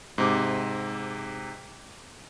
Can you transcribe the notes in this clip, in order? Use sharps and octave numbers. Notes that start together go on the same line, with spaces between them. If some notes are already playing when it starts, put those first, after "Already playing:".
G#2 C3 D6